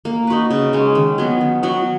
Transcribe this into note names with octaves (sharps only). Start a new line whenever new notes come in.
A#3
D#4 F#4 B4
C#3
G#3 C#4
D#3
F#3 B3
D#3
F#3 B3 F#4